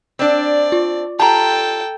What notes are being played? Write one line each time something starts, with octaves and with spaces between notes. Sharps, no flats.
C4 D4 D5
F4
F4 G4 A4 G5 A5 A#5